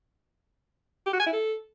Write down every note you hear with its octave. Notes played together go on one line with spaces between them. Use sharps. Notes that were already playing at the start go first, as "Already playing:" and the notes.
G4
F#4
G#5
E4
A4